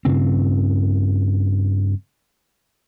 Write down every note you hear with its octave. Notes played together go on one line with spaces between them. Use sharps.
G2 C#3 C4